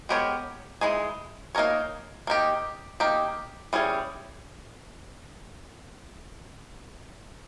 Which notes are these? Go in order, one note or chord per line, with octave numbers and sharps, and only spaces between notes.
G#3 B3 G4 A#4 C#5
E3 G#3 D#4 G#4
A#3 D#4 A#4 C#5
A#3 D#4 G4
A#3 D#4 G4
E3 G3 C#4 G#4 C#5